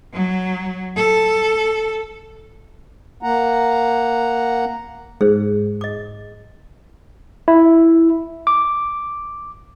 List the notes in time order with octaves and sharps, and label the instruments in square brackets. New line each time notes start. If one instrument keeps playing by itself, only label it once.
[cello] F#3
A4
[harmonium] A#3 F#5 A#5
[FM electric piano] G#2 [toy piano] G#4 C5
[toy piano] D#5 D6
[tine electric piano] E4
D6